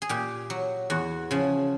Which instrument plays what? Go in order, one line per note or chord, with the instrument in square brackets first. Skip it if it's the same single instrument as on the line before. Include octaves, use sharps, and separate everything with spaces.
[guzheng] G#4
A#2 G4
F#3
E2 F#4
C#3 F3